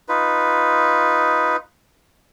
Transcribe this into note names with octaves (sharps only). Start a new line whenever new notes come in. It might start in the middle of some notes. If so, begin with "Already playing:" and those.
D#4 F4 B4